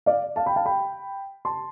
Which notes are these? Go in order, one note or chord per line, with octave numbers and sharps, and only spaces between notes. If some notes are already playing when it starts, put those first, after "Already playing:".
D5 F5
F5 A5
G5 B5
F5 A5
G5 B5
A5 C6